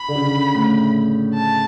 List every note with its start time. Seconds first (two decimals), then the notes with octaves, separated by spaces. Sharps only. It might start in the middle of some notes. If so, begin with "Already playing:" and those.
Already playing: B5
0.08 D3
0.15 C#3
0.55 A2
1.34 A5